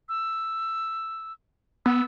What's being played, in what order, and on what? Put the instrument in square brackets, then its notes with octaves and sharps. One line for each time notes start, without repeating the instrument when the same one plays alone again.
[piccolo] E6
[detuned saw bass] B3 [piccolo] E6